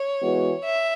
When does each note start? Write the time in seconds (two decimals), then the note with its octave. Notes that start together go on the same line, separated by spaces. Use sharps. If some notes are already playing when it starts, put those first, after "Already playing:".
Already playing: C#5
0.20 E3 G#3 B3 F#4
0.65 E5